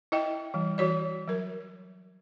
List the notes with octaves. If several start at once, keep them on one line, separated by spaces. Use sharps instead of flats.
E4 D#5 E5 G5
E3 G3
E3 F#4 C#5 D5
F#3 A#4